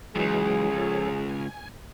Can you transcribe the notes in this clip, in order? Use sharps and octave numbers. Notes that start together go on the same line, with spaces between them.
C#2 G2 E3 F#3 G#3 G#4
F3 A4 C#5
G#5